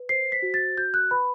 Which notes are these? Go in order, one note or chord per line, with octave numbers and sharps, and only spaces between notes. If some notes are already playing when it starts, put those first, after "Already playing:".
Already playing: B4
C5 C7
B6
F#4
A6
F#4 G6
F#6
B4 B5